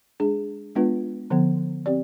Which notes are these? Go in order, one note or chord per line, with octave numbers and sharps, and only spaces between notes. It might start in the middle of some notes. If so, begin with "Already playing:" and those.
G#3 D4 G#4
G#3 B3 D4 F4 B4
D3 F3 B3
C4 G4 D5